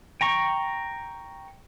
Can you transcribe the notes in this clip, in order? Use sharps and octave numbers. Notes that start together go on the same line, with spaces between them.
G5 A#5 C#6